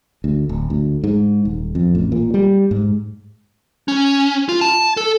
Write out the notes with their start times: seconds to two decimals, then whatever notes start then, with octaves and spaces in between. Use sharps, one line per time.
0.24 D2
0.49 D1
0.70 D2
1.04 G#2
1.45 D#1
1.75 F2
1.95 A1
2.12 A#2
2.34 G3
2.71 G#2
3.88 C#4
4.49 F4
4.61 A5
4.97 A4